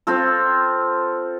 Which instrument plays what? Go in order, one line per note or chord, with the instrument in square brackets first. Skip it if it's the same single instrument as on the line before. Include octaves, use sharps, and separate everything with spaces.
[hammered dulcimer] C4 F4 A4